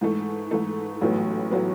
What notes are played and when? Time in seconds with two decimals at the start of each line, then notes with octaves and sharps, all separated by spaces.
0.01 G#2 E3 A3
0.51 G#2 E3 A3
1.01 A1 A2 F#3 B3
1.51 A2 F#3 B3